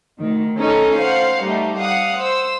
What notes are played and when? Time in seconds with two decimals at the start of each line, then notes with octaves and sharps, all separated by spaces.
0.20 D2 D#3
0.57 C#4 D#4 A4 C#5
1.00 C5 F5 F#5
1.44 G3 A3 D#4
1.80 F5 F#5 D#6
2.19 C5 E6